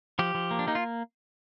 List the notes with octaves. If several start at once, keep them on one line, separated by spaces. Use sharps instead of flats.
F3 G4
F3
A#3
D4
A#3 D#4
F4